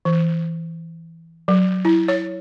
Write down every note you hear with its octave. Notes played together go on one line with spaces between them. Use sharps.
E3
F#3
E4
C#5